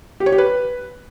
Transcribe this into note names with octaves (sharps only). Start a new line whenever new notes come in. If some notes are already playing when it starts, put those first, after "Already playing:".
G4
C#5
G4
B4